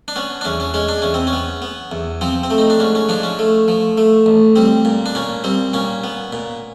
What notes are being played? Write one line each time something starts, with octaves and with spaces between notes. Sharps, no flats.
D4
B3 C#4
D4
E2 C#4
C#4
G#3 C#4
D4
E2 C#4
C4
C#4
B3
B3
E2
F3 C4
C4
A3
D#4
D4
G#2 C#4
C#4
F3 D4
C#4
A3
F3
A3
A1
G3 C4
A#2
D4
A#2 C#4
G3 C4
A#2 C#4
B3
A#2